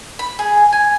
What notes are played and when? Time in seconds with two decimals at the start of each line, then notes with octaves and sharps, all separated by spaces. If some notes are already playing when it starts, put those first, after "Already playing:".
0.19 B5
0.39 G#4
0.73 G#5